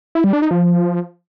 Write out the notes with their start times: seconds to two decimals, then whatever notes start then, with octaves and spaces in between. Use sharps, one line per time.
0.15 E4
0.24 G3
0.33 D4
0.42 D#4
0.51 F3